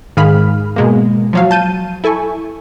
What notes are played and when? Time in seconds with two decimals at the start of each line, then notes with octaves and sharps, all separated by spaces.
0.17 G#2 D#3 G#4 F5 B5 F6
0.76 B2 G#3 A#3
1.33 F3 F#3 F5
1.51 A5 G6 D#7
2.04 E4 A4 G#5 C#6